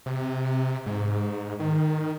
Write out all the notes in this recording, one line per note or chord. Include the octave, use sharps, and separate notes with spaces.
C3
G#2
D#3